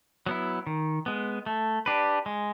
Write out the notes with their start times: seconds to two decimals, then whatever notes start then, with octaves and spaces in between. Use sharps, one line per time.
0.26 F#3 B3 E4
0.67 D#3
1.06 G#3 B3
1.46 A3
1.86 D4 G4 B4
2.26 G#3